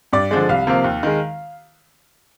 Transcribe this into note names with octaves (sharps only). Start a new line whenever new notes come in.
G2 D5
D3 F3 G#3
C2 F5
C3 F3 A#3
D#2
D#3 G#3